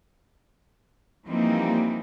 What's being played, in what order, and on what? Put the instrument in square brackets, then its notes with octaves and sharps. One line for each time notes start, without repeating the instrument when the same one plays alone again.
[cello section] E3 F3 G3 A#3 C4 D#4